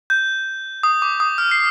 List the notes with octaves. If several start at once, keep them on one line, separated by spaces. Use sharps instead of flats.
G6
D#6
D6
D#6
F6
C7